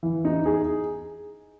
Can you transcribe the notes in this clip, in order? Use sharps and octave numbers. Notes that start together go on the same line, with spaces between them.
E3
D#4
G#4